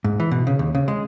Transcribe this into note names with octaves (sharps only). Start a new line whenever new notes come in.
G#2
E3
B2
C#3
D#2
C#3
G#3